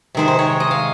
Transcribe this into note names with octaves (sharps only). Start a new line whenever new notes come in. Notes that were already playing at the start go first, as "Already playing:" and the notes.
C3 D#3 G#3 C5
C5
C#5
D#5
F5